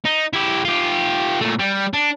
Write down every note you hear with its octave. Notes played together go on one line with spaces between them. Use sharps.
D#4
E4 G4
F4 G4
A#2 A3
G3
D4